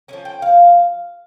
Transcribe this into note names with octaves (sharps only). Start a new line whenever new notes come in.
F3 G#3 C#4 G#5
G5
F5